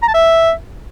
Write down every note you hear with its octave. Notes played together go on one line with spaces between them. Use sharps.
A#5
A5
E5